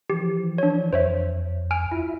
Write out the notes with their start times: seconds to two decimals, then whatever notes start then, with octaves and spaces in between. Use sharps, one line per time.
0.10 E3 F3 G4
0.58 D4 C#5
0.93 F2 C5 C#5 E5
1.71 G#5 F6 D7
1.92 E4 F4 E5